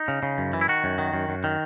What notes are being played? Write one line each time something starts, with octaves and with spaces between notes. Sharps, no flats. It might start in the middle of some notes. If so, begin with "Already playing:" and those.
Already playing: D#4
C#3
C#3
F#2
E3
E4
D#3 F#4
F#2
D#3
F#2
F#2
D#3